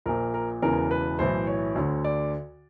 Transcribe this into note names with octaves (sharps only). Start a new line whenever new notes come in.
A#1 A#2 A#4
A#4
E1 E2 C#3 E3 A#4
B4
B1 A2 E3 C5
C#5
D2 D3
D5